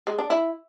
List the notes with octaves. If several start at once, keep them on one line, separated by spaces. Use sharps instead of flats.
G#3
D4
E4